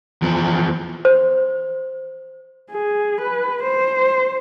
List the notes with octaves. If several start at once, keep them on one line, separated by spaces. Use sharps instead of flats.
E2 F3
C5
G#4
B4
C5